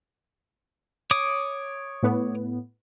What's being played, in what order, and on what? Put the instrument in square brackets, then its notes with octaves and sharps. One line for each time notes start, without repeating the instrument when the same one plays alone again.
[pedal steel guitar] C#5 D6 D#6
[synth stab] A2 B3